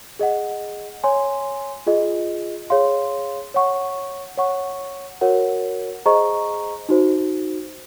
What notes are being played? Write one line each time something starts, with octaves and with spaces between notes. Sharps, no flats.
G#4 D#5 F#5
C#5 G#5 C6
F4 G#4 D#5
G#4 C#5 F5 C6
C#5 F#5 C#6
C#5 F#5 C#6
F#4 A#4 C#5 F#5
G#4 C5 D#5 A#5 C#6
D#4 F#4 C5